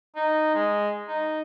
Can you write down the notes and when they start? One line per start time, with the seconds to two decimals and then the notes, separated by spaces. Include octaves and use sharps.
0.16 D#4
0.55 G#3
1.08 D#4